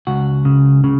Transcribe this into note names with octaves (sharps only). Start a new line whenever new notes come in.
C#2 F#4
C#3
C#3